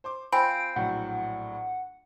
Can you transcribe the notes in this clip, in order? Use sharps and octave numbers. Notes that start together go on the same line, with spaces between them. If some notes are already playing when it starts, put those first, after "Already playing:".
C5 C6 D6
C4 F4 G5 G#5 B5 D7
A#1 A2 F#3 F#5